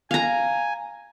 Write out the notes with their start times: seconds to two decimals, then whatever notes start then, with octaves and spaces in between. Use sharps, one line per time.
0.11 F5 G#5 A#5